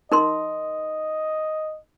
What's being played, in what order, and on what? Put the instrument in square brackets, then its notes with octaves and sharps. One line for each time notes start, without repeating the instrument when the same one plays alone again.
[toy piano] D#4 A#4 C6 [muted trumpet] D#5